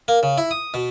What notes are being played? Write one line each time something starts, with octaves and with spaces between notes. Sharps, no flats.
A#3
C#3
E4
D#6
B2